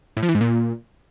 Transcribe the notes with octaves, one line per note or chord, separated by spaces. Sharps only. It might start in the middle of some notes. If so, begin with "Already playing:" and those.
A2
F3
E3
G#2
A#2